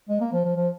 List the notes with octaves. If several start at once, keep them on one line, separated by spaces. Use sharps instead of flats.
G#3
A#3
F3
F3
F3